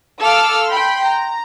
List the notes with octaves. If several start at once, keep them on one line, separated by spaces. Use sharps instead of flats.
A4 F5 D6 E6 F6
G5 B5 C6
A#5